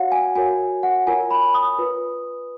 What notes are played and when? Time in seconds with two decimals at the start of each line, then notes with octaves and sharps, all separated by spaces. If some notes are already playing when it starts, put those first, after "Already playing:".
Already playing: F#4 C#5 F5 F#5
0.12 G#5
0.35 F#4 A#4 C#5 G#5
0.83 F#5
1.07 F4 A#4 C#5 G#5
1.31 B5
1.54 D#6
1.78 F4 B4